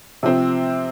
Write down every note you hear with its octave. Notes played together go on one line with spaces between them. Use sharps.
C3 F3 C4